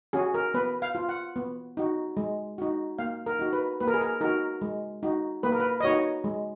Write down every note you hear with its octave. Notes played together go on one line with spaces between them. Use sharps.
C#4 F#4 G#4
A#4
B3 B4
F5
F4
F#5
B3
D#4 F#4
G#3
D#4 F#4
A#3 F5
A#4
D#4 F#4
B4
A#3 B4
A#4
G#4
A#4
D#4 F#4 A#4
G#3
D#4 F#4
A#3 B4
A#4
B4
D#5
D#4 F#4 C#5
G#3